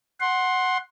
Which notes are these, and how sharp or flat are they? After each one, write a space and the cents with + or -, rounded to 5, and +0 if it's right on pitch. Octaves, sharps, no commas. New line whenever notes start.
F#5 +0 C6 +15